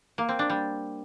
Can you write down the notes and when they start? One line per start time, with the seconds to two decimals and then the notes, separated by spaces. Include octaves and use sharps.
0.18 A#3
0.29 C4
0.39 D4
0.50 G3